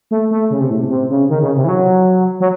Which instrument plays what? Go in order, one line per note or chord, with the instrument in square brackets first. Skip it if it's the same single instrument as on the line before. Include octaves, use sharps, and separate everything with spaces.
[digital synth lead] A3
A3
C#3
C3
A2
C3
C3
C#3
D#3
C#3
C3
E3
F#3
F#3